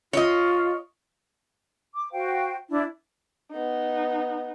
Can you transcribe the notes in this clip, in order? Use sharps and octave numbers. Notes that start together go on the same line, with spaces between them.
F4 C#5 D#5
D6
F#4 C5 F5 G5
D4 E4
B3 D#4